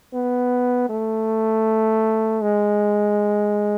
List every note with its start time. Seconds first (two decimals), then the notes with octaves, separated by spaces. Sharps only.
0.14 B3
0.89 A3
2.42 G#3